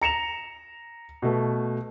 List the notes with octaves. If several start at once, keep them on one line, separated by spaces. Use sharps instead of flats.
A#5 C#7 E7 F7
B2 A3